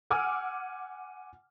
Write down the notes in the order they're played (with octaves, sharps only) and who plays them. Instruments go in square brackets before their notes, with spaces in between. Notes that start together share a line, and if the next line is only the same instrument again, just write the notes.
[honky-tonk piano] F#5 G#5 D6 E6 F6